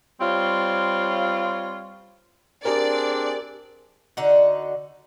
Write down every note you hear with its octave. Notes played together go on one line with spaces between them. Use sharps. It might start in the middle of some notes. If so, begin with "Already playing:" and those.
G3 C4 F4 C#5
C4 D4 G4 G#4 A#4 D5
D3 D#4 F#4